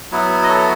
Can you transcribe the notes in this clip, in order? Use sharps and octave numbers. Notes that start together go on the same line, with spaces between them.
F#3 B3 E4
D#5
A4 C#5